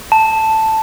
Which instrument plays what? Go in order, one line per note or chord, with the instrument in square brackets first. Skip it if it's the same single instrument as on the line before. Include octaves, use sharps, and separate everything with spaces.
[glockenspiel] A5